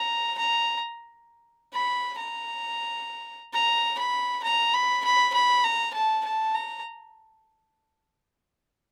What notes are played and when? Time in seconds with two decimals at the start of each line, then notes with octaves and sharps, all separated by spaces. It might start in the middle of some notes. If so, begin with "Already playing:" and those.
Already playing: A#5
0.38 A#5
1.73 B5
2.18 A#5
3.53 A#5
3.98 B5
4.44 A#5
4.74 B5
5.04 B5
5.34 B5
5.64 A#5
5.94 A5
6.25 A5
6.54 A#5